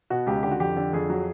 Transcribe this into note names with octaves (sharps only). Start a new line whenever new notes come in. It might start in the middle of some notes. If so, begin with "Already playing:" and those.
B2 F#4
C#2 G4
D3 G4
F#4
F2 G4
D3
F2 G#4
F#3